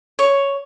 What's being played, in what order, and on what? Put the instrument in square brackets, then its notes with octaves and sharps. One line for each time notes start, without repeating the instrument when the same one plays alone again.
[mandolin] C#5